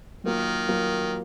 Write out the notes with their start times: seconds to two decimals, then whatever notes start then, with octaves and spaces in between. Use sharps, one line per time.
0.24 D#3 F#3 A#3 F4
0.68 F#3 A#3 F4